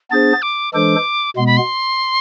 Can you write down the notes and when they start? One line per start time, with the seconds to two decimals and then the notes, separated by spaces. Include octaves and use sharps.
0.11 B3 D4 G#4 C5 A6
0.42 D6
0.74 E3 G#3 D4 A4 C5 D6
1.36 B2 G#3 B3 C6
1.47 B5
1.57 C6